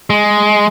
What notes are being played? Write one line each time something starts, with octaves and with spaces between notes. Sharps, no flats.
G#3